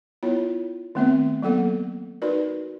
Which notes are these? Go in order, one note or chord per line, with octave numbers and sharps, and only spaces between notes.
B3 E4 F4 C#5
D#3 A3 B3 C4 E5
F#3 A#3 B3 A4 F#5
D#4 F#4 A#4 B4 D5